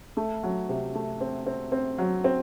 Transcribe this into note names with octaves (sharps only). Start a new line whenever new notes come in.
A3
F#3
C3
A3
C4
C4
C4
F#3
C4